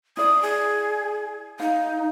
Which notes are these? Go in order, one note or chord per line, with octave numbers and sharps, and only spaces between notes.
E4 D5 D#6
G#4
D#4 F5